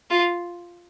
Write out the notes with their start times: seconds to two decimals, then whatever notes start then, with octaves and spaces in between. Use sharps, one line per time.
0.10 F4